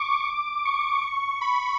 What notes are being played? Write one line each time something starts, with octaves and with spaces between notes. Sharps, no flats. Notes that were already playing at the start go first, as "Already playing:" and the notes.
Already playing: C#6 D6
C#6
B5